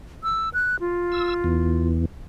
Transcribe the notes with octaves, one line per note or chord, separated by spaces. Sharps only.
E6
F#6
F4
E6
E2